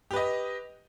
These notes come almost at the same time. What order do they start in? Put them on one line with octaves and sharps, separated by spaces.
G4 B4 D#5